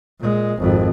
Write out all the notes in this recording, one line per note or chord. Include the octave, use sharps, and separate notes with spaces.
A#2 G#3
G#1 F2